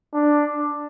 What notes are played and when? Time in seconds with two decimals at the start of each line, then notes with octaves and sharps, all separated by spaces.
0.13 D4